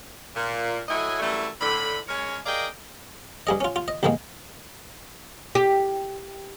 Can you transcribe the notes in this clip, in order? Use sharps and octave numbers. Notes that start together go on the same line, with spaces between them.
A#2
A2 F#3 A3 E4 D#5 G#5
F#2 E3 G3 A3
A2 D3 B5
G#3 C#4 A#4 C#5
G#4 A#4 D5 D#5 F5 G5
G2 G#4 D#5
C#4 F4
F4
D#5
C2 G#2 D#3 G#3 A#3
G4